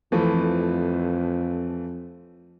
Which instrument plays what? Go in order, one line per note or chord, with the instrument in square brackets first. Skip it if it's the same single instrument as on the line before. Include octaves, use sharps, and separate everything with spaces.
[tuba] F2 [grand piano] E3 F3 A3